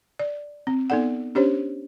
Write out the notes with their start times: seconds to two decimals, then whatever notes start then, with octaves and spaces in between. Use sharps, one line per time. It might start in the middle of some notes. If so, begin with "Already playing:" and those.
0.19 D5
0.67 C4
0.90 B3 D#4 A4 D5 F#5
1.35 C#4 D4 G4 C5 C#5